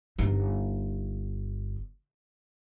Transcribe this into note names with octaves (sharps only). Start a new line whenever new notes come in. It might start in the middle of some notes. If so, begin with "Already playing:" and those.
G1 D#4